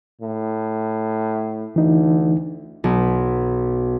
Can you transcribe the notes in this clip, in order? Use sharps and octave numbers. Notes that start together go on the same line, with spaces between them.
A2
D2 E3 D#4
B1